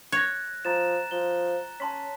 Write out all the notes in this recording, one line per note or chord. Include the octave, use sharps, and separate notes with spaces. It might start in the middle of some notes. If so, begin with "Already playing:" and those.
C#5 F#6 A#6
F3 A#5 A6 E7
F3 G7
C#4 A5 C6 B6